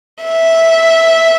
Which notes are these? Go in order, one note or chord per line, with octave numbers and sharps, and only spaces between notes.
E5